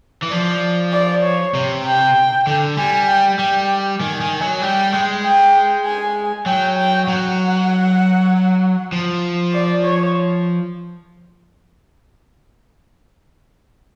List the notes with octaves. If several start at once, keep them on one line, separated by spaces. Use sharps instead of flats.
E3
F3 D5
D5
C#5
C3
G5
D3
G3 G#5
G5
G3 G5
D#3 G#5
D#3
F#3
G3 G5
G#3
G5
G#5
F#3 G5
G5
F#3 F#5
F3
D5
C#5